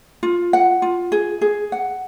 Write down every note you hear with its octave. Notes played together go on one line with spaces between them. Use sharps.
F4
F#5
F4
G#4
G#4
F#5